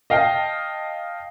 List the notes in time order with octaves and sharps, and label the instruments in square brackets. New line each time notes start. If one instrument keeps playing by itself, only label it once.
[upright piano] D#5 F5 G5 A5